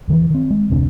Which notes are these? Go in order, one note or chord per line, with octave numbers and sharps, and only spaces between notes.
E2 D#3 E3
D#3 C4
G#3
F1 D2 C3 D4